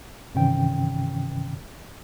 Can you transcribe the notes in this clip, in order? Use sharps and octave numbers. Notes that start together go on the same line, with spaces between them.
G2 C3 D#3 E3 C#4 G5